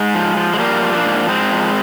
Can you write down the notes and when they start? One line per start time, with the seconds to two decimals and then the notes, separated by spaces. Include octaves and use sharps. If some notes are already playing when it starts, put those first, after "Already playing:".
Already playing: G#2 G#3
0.14 F3
0.37 F3
0.54 G#3
0.59 F3 G3 A#3
0.82 F3
0.94 A#3 D4
1.06 G#2
1.28 G#2 G#3 C4
1.51 F3